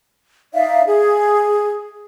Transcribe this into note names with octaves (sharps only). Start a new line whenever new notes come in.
D#4 D5 E5 F5
G#4